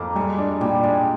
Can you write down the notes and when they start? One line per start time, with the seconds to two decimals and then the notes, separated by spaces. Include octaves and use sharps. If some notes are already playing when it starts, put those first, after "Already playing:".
Already playing: F2 A#3 D#4
0.15 G3 G#3
0.38 D4
0.61 A#2 G3
0.83 G#3 D4